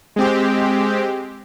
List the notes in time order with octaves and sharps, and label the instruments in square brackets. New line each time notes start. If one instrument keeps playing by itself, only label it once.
[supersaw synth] G#3 C4 G4